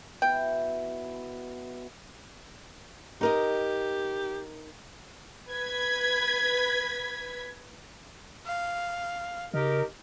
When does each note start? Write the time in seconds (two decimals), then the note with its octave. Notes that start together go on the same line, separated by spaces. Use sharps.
0.22 B2 E4 G5
3.21 D#4 G4 A#4 D#5
5.50 B4 G#6 B6
8.46 F5
9.54 C#3 D#4 G4 A#4